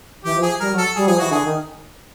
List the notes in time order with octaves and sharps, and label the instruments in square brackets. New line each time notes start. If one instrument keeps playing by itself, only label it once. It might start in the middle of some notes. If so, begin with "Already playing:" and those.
[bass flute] E3 [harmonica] G4
[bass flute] F3
[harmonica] G#4
[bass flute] G3 [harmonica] A#4
[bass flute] F#3
[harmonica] A4
[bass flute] G3 [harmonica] G#4
[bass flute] F3 [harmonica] G#4
[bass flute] E3 [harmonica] F#4
[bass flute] D3 [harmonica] G#4
[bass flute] D#3